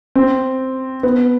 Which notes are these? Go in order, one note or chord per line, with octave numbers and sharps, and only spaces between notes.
C4
B3